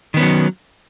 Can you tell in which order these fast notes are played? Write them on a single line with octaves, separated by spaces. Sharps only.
D#3 B3 C#4 F#3